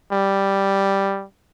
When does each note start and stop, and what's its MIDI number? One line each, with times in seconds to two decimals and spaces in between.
0.12 1.25 55